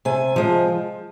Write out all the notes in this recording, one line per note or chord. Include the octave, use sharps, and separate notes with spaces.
C3 G#5
F3 G#3